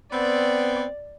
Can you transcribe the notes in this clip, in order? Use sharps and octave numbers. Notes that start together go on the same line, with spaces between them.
B3 C4 D5